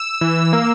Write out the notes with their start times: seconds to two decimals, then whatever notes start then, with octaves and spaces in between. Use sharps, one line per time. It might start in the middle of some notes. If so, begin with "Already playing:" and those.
Already playing: E6
0.21 E3
0.53 A#3